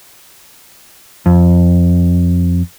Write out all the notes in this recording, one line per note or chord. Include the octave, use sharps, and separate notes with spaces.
F2